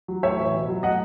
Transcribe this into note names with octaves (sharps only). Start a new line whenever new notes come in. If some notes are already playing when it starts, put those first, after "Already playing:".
F#3
A2 C#5 E5
E3
B2
F#3
A2 D#5 F#5